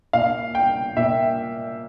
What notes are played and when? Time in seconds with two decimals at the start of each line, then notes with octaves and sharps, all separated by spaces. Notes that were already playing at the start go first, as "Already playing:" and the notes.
0.13 A#2 F5
0.55 G5
0.97 A#2 E5